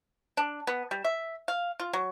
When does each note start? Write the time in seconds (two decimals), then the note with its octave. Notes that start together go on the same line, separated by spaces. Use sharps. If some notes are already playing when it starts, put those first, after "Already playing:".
0.37 D4
0.67 B3
0.91 G3
1.04 E5
1.48 F5
1.80 F4
1.93 F#3